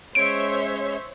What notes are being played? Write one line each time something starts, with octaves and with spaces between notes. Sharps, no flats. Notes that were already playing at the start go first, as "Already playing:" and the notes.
G#3 C#4 C5 C#5 E5 D7